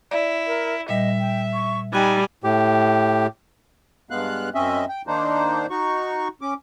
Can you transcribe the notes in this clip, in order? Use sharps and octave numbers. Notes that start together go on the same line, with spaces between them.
E4 D5
A#4
A#2 G3 D#5 E5
G5
C#6
G3 D#4 G5 G#5 B5 F#6
A2 G4
G2 G#3 B3 F5 F#6
F#2 C4 C#4 D#5 E5
G5
D#3 A#3 D4 D#4 C5
D#4 F#4 C#6
C#4 D6